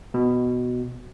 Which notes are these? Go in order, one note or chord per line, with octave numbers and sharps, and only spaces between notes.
B2